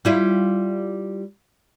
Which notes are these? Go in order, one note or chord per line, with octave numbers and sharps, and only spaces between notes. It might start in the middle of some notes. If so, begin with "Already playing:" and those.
G3 E4 F4